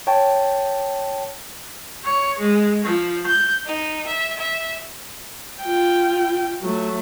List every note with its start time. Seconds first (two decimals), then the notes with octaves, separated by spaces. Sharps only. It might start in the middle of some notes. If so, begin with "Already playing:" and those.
0.07 C#5 G5 A5
2.05 C#5
2.38 G#3
2.84 F3
3.27 G6
3.64 D#4
4.07 E5
4.37 E5
5.63 F4 G5
6.61 F#3 A3